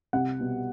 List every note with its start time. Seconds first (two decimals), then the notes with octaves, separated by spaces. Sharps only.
0.13 C2 F#5
0.39 B2 G3